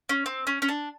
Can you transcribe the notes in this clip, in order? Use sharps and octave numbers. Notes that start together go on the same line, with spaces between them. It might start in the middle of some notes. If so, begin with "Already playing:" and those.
C#4
C4
C#4
C#4
D4